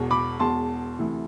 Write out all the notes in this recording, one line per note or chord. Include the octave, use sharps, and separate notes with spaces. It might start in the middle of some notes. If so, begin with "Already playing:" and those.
Already playing: E1 E2 B2
B5 D6
E1 E2 B2 A5 C6
D2 C3 E3